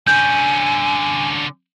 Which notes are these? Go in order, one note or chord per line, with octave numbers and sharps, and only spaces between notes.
D3 C#4 G#5 G6